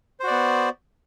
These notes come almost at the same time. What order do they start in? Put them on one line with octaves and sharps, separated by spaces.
C5 F#4 D5 B3